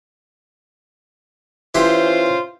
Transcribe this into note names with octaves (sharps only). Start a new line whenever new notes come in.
E3 C#4 F4 G4 C5